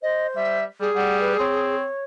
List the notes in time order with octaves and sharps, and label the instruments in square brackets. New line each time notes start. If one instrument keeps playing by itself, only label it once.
[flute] C5 [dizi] D#5
[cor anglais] G3 [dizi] E5
[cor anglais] G3 [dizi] G#4
[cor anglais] G3 [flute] F#5
[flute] B4
[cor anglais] C4 [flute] C#5